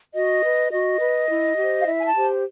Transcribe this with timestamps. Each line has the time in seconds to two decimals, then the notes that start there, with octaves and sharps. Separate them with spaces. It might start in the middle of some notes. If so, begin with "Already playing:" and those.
0.13 F#4 D#5
0.43 B4
0.71 F#4 D#5
1.00 B4
1.29 E4
1.57 G4 C5
1.79 F5
1.86 E4 E5
1.99 G#5
2.05 A5
2.15 G4 C5